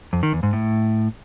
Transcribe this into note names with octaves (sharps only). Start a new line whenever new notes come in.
F2
D#3
E2
G#2
A2